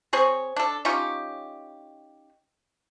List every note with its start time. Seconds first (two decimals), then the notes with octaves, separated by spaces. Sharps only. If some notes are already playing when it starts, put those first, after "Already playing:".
0.13 C4 G#4 C#5
0.56 D4 A4
0.85 C#4 D#4 F4 G4